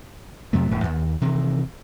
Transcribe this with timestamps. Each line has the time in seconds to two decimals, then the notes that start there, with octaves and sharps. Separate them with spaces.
0.53 F2 C3 F#3 A3
0.71 D#1 A2
0.84 D#2
1.21 C3 D#3 E3